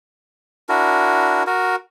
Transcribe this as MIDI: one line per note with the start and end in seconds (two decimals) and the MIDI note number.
0.69 1.43 62
0.69 1.43 64
0.69 1.43 66
0.69 1.43 70
1.47 1.76 66
1.47 1.76 70